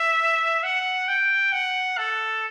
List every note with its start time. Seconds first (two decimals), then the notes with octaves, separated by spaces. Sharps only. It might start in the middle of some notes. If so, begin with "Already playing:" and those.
Already playing: E5
0.63 F#5
1.08 G5
1.53 F#5
1.98 A4